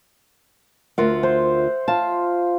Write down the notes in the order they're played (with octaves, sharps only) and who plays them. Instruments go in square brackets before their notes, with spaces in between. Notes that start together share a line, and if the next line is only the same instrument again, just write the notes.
[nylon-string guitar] D2 F4 A#4 [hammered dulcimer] E5 F#5
[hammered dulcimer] C5
[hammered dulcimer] F4 [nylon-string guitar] A5